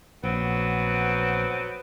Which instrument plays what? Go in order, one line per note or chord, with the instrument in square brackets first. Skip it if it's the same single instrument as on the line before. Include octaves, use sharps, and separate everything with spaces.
[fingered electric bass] A#1 [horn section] F#3 B3 C4